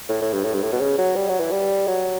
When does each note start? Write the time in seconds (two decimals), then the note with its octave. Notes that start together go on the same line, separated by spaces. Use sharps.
0.09 A2
0.21 A2
0.33 G2
0.44 A2
0.54 G2
0.63 A2
0.72 B2
0.80 C#3
0.98 F#3
1.16 G3
1.29 F#3
1.40 E3
1.51 G3
1.87 F#3